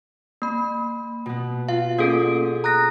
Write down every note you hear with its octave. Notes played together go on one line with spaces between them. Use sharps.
A#3 B5
B2 B3
F4 F5
A#3 C#4 G#4 A4
A#5 D#6 F#6 A#6